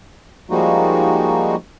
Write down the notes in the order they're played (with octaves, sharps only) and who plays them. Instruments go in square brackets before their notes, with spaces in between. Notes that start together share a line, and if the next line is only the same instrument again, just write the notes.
[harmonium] F3 G3 G#3 A#3 D#4 F#4